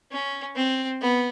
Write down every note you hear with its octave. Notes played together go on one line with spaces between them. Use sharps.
C#4
C4
B3